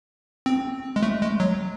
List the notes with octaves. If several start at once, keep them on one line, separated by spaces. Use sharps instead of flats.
C4
G#3
A3
G#3
F#3